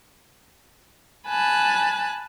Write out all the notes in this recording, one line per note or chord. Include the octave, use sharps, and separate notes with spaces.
G#5 A5 B5 F#6